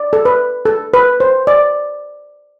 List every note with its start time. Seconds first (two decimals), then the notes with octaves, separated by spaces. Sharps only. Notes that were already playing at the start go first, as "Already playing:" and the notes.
Already playing: D5
0.13 A4
0.25 B4
0.65 A4
0.94 B4
1.20 C5
1.47 D5